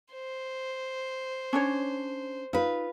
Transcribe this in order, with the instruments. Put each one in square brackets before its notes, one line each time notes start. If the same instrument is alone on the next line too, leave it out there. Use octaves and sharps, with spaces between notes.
[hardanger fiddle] C5
[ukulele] C#4 D4 C#5
[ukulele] D#4 [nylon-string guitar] F4 B4